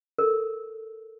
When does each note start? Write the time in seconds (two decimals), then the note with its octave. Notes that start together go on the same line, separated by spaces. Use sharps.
0.18 A4 A#4